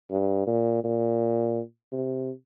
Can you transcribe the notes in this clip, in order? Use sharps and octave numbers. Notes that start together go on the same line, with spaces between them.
G2
A#2
A#2
C3